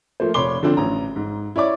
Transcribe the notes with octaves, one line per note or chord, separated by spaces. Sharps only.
F3 A3 A#3 C5
F1 C#5 B5 C6 D6 G7
D3 F3 C4 D4
A1 A#5
G#2
E4 C#5 D5 D6